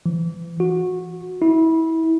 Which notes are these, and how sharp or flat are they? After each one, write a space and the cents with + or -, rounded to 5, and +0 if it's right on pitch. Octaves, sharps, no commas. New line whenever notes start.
E3 +40
F#4 -20
E4 -25